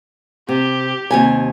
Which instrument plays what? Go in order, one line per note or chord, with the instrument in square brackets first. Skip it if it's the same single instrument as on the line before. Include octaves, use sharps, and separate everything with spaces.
[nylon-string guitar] C3 [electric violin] G4
[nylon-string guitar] D#2 C3 G#5